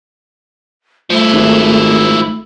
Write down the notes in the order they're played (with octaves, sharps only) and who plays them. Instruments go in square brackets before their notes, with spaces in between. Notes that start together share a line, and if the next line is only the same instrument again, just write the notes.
[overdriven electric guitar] F3 E4 [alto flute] A3
[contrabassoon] G#1